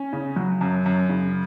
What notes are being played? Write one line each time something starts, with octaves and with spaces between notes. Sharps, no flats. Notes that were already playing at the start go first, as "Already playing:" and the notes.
Already playing: C#4
C#3
F#3
F#2
F#2
C#3